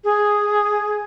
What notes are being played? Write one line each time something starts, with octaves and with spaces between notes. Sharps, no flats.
G#4